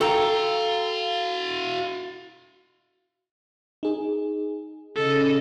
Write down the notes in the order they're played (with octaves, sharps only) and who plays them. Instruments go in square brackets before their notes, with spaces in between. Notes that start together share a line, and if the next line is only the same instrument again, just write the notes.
[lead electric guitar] F#4 F5 [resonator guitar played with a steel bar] A4 G5 A#5
[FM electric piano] D#4 G#4
[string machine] C#3 D#5 [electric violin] A4